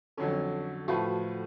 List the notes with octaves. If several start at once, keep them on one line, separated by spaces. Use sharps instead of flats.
F2 D3 F#3 C#4 A4
A2 F3 A3 F4 F#4 B4